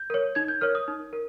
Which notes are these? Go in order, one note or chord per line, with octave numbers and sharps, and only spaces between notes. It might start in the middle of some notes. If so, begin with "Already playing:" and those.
Already playing: G6
A#4 C#5
D#4 G#6
G6
A#4 C#5 F6
D#6
D#4
A#4